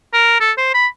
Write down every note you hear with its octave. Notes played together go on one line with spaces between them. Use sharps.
A#4
A4
C5
B5